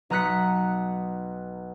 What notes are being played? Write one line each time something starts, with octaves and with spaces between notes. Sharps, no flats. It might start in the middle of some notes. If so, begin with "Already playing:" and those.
B1 A#5 D#6 F#6 B6 C#7